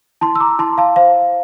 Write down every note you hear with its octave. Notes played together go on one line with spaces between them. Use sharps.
E4 A5 C6
E6
A#5 D6
E4 A5 C6
F5 A5
C5 F5